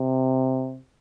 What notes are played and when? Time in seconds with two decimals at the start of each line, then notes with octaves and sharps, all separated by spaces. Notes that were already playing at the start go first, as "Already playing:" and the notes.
Already playing: C3